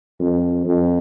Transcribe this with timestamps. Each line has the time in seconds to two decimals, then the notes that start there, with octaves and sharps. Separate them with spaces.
0.19 F2
0.65 F2